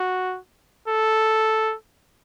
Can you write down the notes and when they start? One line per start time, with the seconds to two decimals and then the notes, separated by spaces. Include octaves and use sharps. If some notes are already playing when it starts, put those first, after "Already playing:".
Already playing: F#4
0.88 A4